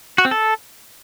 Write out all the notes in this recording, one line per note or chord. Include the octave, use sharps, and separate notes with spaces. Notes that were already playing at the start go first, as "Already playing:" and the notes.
F#4
C4
A4